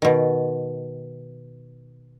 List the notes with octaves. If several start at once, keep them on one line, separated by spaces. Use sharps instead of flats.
B2 D#3